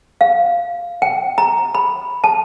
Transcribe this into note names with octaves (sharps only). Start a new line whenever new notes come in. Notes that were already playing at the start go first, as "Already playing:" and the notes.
F5
G5
A#5
B5
A5